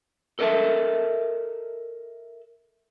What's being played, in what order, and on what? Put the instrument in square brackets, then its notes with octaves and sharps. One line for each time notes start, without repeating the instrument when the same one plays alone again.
[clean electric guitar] A4 A#4 D#5 E5 A5